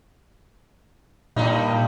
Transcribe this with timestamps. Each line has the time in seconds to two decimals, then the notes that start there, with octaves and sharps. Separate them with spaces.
1.36 G2 A#2 G3 D#4